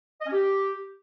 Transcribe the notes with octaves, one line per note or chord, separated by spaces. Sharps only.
D#5
C#4
G4